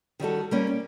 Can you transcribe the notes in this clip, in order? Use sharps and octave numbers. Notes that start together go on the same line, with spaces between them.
D#3 G3 F#4 A4
G3 A#3 C#4
D5